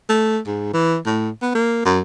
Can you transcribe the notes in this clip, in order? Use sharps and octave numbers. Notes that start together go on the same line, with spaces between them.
A3
G#2
E3
A2
B3
A#3
F#2